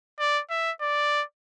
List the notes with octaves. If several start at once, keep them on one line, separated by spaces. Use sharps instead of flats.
D5
E5
D5